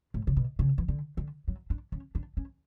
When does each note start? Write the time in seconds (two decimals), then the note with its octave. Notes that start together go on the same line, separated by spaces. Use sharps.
0.14 A2
0.27 C#3
0.37 B2
0.59 C#3
0.78 E3
0.88 D3
1.17 D3
1.48 F#3
1.70 D4
1.92 C#4
2.15 D4
2.37 C#4